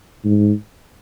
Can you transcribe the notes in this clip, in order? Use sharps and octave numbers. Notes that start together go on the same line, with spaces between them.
G#2